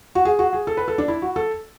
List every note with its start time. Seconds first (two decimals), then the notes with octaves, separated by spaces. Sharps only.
0.15 F#4
0.25 G#4
0.39 F#4
0.53 G#4
0.67 A4
0.77 B4
0.88 A4
0.98 D4
1.08 E4
1.22 F#4
1.36 A4